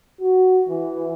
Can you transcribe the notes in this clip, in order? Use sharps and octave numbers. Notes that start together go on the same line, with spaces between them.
F#4
E3